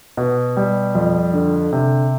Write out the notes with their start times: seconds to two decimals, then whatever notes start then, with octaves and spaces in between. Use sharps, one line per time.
0.17 B2
0.57 G3
0.95 F2
1.34 D3
1.73 C3